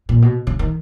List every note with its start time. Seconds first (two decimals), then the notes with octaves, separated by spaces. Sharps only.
0.09 A#2
0.22 B2
0.47 C#3
0.59 D#3